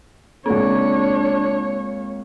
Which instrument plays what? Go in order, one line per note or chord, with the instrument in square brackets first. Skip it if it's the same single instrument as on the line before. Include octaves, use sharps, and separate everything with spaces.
[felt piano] C#2 A#3 [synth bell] C4 [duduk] D4 [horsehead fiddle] C#5